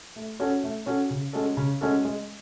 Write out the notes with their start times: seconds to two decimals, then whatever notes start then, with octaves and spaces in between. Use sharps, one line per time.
0.16 A3
0.40 C#4 F#4 A4 C#5
0.64 A3
0.86 C#4 F#4 A4 C#5
1.10 C#3
1.33 G#3 C#4 F#4 A4
1.57 C#3
1.81 G#3 C#4 F#4 A4
2.05 G#3